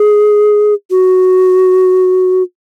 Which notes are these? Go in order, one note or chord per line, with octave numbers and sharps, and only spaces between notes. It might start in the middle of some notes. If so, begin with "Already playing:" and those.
Already playing: G#4
F#4